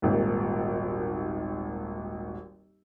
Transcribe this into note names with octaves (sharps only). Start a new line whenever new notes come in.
D#1 G#1 D#2